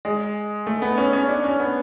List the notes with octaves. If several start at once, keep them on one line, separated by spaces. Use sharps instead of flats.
G#3
A3
B3
C#4
C#4
D4
C#4
B3